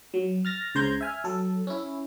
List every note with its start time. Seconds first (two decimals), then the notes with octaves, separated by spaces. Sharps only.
0.14 F#3
0.45 F6 A6 A#6
0.75 C#2 C#3 C5 A#5 G6 G#6
1.01 E5 G#5 F6
1.24 F#3 A4
1.67 C#4 E4